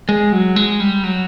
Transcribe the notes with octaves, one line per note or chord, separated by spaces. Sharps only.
G#3
F#3
G#3
G3
F#3